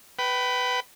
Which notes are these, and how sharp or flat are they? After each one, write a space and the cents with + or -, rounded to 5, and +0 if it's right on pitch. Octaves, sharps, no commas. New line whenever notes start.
B4 +5 G5 -30